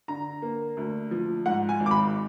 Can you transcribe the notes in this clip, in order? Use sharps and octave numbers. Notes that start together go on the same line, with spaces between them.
D3 A#5
A#3
D2
F3
G#2 F#5
G#5
G#1
D6
B5